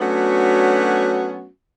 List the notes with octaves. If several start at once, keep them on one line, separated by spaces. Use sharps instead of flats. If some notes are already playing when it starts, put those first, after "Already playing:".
F#3 A3 B3 C#4 D4 F#4